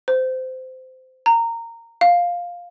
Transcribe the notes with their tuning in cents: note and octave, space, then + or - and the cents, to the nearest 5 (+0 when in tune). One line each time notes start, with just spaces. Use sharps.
C5 -20
A#5 -15
F5 +5